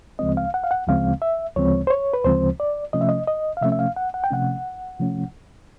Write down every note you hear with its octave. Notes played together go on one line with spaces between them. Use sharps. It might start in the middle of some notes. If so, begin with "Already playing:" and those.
D2 C#3 F3 G#3 C4 D#5
F5
F#5
F5
F#5
D2 C#3 F3 G#3 C4 F5
E5
D2 C#3 F3 G#3 C4 C#5
C5
C#5
B4
D2 C#3 F3 G#3 C4 C5
D5
C3 F3 A3 C#4 D#5
E5
D#5
D#5
F5
C3 F3 A3 C#4 E5
E5
F5
F#5
F#5
G5
C3 F3 A3 C#4 F#5
C3 F3 A3 C#4